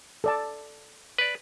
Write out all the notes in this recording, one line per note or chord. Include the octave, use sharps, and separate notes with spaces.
A4 D5 A5
B4 D5